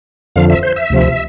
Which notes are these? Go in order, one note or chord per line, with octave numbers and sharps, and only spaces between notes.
F2 D3 F3 F5
E5
C5
E5
D2 C3 F3